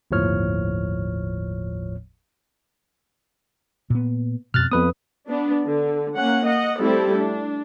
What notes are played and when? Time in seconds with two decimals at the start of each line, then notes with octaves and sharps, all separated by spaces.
0.11 G1 D#2 A2 F3 C#5 F6
3.90 A#2 B3
4.54 F2 G#2 B2 F6 F#6 A6
4.72 F2 B3 B4 D#6
5.28 B3 D4
5.65 D3
6.15 A#3 C#4 F#5
6.45 D#5 F#5
6.80 G3 A3 C4 E4 G4 A4
7.17 D4